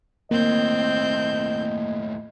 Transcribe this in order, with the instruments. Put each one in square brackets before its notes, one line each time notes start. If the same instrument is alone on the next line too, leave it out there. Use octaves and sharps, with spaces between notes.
[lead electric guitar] D#2 A2 [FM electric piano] A#3 [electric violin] C4 G6 [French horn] D#5